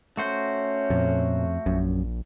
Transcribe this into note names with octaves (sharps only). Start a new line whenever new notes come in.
A3 C#4 F#4 C5
F2 A#2
A#1 F#2